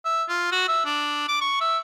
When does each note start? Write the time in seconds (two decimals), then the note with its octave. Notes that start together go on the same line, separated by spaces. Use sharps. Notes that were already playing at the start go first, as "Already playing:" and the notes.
0.05 E5
0.29 F4
0.52 F#4
0.68 E5
0.86 D4
1.28 D6
1.41 C#6
1.61 E5